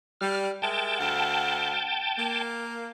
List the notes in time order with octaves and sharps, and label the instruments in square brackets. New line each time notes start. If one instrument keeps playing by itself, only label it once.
[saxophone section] G3 [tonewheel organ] F6
[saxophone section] G#3 A#4 E5 [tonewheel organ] G5 A5
[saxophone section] D2 F5 F#5
A#3